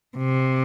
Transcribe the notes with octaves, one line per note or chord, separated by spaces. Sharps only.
C3